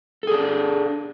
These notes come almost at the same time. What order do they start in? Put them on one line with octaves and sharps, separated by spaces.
A4 G#4 D4